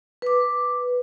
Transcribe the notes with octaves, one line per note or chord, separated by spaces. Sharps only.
B4 D6